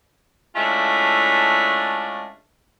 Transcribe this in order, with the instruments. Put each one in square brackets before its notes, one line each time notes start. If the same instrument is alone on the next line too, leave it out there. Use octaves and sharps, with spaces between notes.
[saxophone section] G#3 A3 C#4 D4 E4 F4